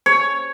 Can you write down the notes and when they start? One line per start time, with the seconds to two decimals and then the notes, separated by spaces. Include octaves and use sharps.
0.06 C#5